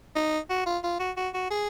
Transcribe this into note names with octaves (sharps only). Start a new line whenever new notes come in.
D#4
F#4
F4
F4
F#4
F#4
F#4
G#4